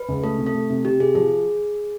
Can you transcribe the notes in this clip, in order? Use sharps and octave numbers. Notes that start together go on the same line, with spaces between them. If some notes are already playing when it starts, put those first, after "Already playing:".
Already playing: B4
C#2
A3 A4
C3
A4
A3
C3
C3 G4
C3 G#4
F3 G#4